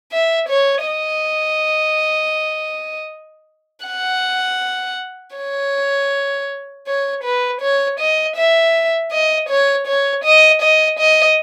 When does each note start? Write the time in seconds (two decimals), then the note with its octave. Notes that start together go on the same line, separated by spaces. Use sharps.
0.12 E5
0.49 C#5
0.86 D#5
3.86 F#5
5.37 C#5
6.87 C#5
7.24 B4
7.61 C#5
7.99 D#5
8.36 E5
9.11 D#5
9.49 C#5
9.87 C#5
10.24 D#5
10.62 D#5
10.99 D#5